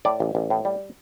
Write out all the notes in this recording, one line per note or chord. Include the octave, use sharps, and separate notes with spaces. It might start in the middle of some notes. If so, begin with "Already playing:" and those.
A2 D5
A1
A1
A2
G3